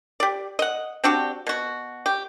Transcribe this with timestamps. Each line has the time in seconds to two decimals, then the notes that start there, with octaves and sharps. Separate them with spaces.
0.20 G4 D5
0.59 D#5 F#5
1.04 C4 D4 F#4 G4
1.47 B2 F#4
2.06 G4